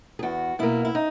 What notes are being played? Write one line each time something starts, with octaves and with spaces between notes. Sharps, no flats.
G#4
E2 F#4
B2 A#3 E4
E4
D#4